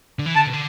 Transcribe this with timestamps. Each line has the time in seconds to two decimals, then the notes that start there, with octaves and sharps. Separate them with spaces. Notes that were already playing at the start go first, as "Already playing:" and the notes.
0.19 D3
0.26 E3
0.35 D3 A5
0.46 B2
0.53 D3